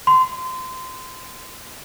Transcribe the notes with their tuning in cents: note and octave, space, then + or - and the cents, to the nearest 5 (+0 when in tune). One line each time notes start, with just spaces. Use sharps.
C6 -25